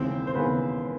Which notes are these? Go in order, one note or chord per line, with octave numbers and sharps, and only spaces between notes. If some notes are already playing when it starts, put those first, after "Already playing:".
Already playing: E1 D#2 C#3 E3 C4 C5
C5
E1 D#2 C#3 E3 B3 B4